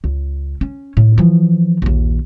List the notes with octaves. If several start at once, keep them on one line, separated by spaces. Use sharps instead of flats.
C#2
C#4
A2 A3
E3 F3
A#1 D#2